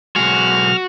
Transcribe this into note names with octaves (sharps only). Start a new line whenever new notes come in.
B1 G#3 F#4 F6